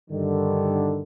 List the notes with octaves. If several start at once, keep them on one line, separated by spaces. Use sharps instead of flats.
G2 D3 D#3